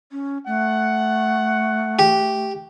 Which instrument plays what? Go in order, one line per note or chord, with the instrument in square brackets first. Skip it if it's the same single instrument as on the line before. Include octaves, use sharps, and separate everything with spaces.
[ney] C#4
[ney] A3 [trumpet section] F#5
[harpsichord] G4